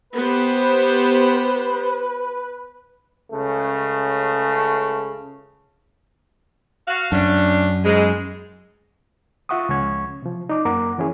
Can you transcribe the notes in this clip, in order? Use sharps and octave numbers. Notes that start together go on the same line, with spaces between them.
B3 G4 B4 C5
C#2 C#3 A3
F#4 F5
F#2 A3 C#4 D4
E2 G#2 G#3
F4 E5 F#5 C#6 D#6
C#2 F3 G#3 C#4 C#6 G#6
C3 F3
D#4 D5 D6
F#2 A#3 A#4 F#5 A#5 D6
E3 F3 C#4 E4 G#4 C#5